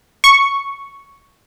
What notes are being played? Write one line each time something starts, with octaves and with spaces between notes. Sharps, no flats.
C#6